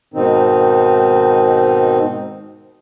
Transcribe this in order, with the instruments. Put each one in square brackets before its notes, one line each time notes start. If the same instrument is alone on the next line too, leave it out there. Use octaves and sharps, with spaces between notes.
[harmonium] G#2 B2 D#3 C4 D#4